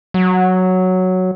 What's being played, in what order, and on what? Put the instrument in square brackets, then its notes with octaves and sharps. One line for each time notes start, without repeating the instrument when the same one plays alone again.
[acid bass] F#3